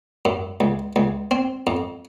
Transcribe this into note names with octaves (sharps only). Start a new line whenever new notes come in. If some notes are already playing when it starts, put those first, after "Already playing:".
F#2
C#2
C#2
C4
F2